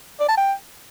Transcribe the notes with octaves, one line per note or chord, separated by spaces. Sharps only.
D5
A5
G5